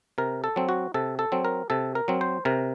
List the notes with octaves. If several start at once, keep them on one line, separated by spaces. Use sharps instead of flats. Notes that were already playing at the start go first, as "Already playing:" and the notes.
C3 A#4
A4
F#3 C4
F#4
C3 A4
A4
F#3 C4
A#4
C3 A4
A#4
F#3 C4
C5
C3 A#4